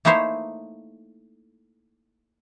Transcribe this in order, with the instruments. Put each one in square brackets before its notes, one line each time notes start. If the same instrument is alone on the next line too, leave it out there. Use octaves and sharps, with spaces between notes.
[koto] A3 A#3 D#4 E4 C5 C#5